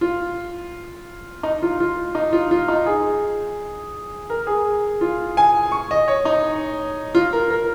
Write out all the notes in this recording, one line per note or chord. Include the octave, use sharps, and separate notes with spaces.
F4
D#4
F4
F4
D#4
F4
F4
D#4
G#4
A#4
G#4
F4
G#5
C#6
D#5
C#5
D#4
F4
A#4
A#4